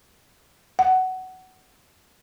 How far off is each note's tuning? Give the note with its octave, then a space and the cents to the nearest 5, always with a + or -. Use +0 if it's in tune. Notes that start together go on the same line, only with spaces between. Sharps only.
F#5 +15